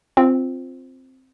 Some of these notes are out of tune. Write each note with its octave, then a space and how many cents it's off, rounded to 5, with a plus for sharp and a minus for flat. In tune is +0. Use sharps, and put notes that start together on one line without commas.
C4 +0 F4 +0